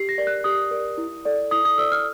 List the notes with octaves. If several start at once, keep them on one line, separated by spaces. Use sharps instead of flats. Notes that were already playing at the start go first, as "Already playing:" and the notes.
Already playing: G4 C7
A#6
A#4 D5
F#6
G4 D#6
A#4 D5
E4
A4 D5
E4 D#6
D#6
A4 D5 E6
F6